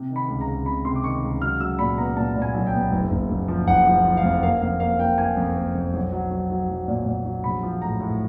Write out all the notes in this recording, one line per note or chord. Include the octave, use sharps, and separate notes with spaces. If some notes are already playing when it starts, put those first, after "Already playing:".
Already playing: C3
D#3
B5
C#2
A#5
C#2
C3 B5
C3 C6
D6
D#3 C#6
C#2
F#3 F6
F#3 E6
A#2 B5
B3 A#5
A#2 A5
A#2
G#5
B1
G5
B3
F#1
F#1
F#1
F3
F#1 F#5
F3
F3
F5
F2
A#3 F5
F2 F5
A#3 F5
A#3 G5
A#3 G#5
F2
A#3
F2
B1
F#3
F#3
F#3
B1
A#2
A#2
F#3
A#1 B5
F3
A2 A#5
A2